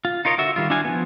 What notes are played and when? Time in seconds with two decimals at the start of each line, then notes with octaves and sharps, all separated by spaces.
0.05 F4
0.25 D#4 F4 A#4 C#5 D#5
0.38 D3 F#4 E5
0.56 D#3 G3 F4
0.70 D4 E4 F#4 F5 G#5
0.85 F3 B3